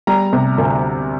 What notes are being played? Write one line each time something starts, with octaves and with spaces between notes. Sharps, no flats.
G3 A#5
C3
D2